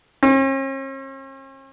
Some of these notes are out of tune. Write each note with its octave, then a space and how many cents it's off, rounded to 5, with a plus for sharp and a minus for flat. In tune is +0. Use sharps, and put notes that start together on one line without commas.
C#4 -45